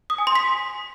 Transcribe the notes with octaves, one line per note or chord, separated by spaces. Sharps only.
D#6
G#5
C6
B6